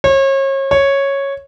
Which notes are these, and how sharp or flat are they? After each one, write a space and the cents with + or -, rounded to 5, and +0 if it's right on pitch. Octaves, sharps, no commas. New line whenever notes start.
C#5 -35
C#5 -5